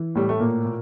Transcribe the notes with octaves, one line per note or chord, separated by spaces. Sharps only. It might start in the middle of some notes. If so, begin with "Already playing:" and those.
Already playing: E3
A2 G3
A3
A#2 A#3
A#2